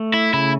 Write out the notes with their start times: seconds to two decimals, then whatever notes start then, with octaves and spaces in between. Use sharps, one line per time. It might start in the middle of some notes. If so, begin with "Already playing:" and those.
Already playing: A3
0.14 E4
0.33 C#3 E4